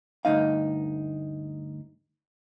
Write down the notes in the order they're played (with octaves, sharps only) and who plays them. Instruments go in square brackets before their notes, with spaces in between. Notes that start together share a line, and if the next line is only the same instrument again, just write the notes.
[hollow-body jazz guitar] D2 G2 D#4 F5